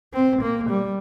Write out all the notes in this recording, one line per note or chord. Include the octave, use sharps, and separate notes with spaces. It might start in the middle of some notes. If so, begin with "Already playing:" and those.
C4
A#3
G3